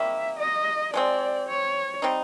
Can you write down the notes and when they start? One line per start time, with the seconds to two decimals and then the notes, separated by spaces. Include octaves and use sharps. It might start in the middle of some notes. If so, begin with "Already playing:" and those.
Already playing: C3 D#3 G3 A#3 E5
0.39 D#5
0.93 F3 G#3 C4 D5
1.49 C#5
2.02 G3 C4 D#4